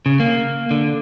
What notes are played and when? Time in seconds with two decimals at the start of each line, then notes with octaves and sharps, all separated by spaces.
0.06 C#3
0.20 A#3
0.71 D3